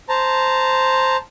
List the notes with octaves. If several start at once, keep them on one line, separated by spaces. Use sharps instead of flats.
C5 A5 A#5